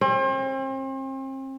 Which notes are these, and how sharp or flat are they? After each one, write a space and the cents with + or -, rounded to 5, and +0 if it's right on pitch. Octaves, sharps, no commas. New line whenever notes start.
C4 +40